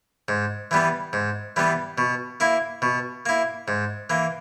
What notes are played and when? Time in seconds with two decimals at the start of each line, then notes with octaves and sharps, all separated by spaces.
0.28 G#2
0.71 E3 G3 B3
1.13 G#2
1.56 E3 G3 B3
1.98 B2
2.40 A#3 E4
2.82 B2
3.26 A#3 E4
3.68 G#2
4.10 E3 A#3